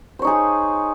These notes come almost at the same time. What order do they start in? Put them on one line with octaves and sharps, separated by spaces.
C5 C#5 D#4 G#4